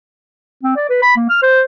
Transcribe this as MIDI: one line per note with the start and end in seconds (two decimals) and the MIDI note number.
0.64 0.75 60
0.76 0.88 74
0.90 0.99 71
1.02 1.16 83
1.16 1.28 58
1.30 1.38 89
1.42 1.62 72